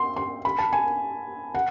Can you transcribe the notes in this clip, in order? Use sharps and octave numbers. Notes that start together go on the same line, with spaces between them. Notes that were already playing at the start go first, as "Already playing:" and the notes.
Already playing: C6
C6
B5
A5
G#5
F#5